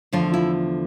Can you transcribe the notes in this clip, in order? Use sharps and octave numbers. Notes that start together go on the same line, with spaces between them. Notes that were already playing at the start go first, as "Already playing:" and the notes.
E2 D3 F3 A3 F4
E4